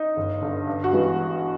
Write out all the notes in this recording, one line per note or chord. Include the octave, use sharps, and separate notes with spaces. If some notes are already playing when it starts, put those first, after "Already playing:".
Already playing: D#4
G1
G2 D3
G2
F#4
E3 G#3 B3